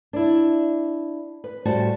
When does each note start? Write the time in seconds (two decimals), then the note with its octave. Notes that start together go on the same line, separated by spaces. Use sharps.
0.13 D4 E4
1.44 B4
1.65 A2 G3 F#4 C5 A5